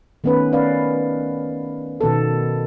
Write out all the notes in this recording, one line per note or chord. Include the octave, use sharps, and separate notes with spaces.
D#3 A3 B3 C#4 B4
C#4 B4 D5 F5
B2 D#3 B3 A4